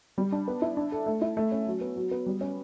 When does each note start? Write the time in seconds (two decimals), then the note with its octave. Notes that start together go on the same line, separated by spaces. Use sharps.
0.18 G3
0.32 D4
0.48 B3
0.62 E4
0.77 D4
0.92 A4
1.06 A3
1.22 E4
1.37 A3
1.52 C#4
1.67 F#3
1.81 B3
1.96 F#3
2.11 B3
2.26 G3
2.41 C#4